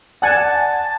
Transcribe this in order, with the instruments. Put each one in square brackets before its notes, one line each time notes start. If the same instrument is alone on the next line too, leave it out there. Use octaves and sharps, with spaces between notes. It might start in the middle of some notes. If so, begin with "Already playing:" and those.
[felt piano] D5 G#6 [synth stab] F#5 G#5 [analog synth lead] A5